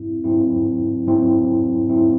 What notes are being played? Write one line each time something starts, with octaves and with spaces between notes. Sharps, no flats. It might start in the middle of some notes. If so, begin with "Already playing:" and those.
Already playing: G#2 F#3 C4 E4
G#2 F#3 C4 E4
G#2 F#3 C4 E4
G#2 F#3 C4 E4